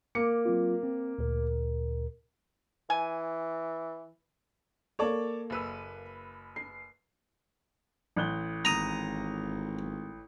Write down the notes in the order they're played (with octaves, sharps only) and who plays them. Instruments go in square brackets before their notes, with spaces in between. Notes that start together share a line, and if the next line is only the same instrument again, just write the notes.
[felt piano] A#3 D6 C#7
[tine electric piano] F#3 C4 F4
C4
D2 A#2 A#4
[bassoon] E3 [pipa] G#5
[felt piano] A#3 A4 [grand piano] C#5 D5 A5
[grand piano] F#1 B4 E6
[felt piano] C7
[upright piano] A1 F#6 G7
[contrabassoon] G#1 [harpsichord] A#5 D#6